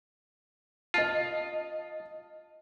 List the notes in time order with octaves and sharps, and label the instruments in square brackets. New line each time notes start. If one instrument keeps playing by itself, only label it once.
[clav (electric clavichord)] F4 [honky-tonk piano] D#5 A5